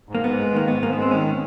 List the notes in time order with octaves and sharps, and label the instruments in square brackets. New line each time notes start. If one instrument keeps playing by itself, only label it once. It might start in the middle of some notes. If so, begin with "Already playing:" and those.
[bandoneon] G#2
[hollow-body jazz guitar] A#3
[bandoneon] G#2 [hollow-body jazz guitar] B3
[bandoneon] G#3
[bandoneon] D#3 [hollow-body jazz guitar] A#3
[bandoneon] G#2 [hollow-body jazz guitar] B3
[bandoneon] G#2 [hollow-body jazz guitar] A#3
[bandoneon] G#3 [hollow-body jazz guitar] B3
[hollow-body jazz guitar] C4
[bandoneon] D#3 [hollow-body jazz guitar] C#4